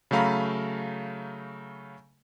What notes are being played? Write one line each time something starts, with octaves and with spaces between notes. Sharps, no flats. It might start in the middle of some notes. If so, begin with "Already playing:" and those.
C#3 F#3 A3 F5 A#5 B5